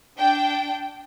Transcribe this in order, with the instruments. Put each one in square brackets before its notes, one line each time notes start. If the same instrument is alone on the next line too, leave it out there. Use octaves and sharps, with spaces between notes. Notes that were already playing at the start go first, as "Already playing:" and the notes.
[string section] D4 G5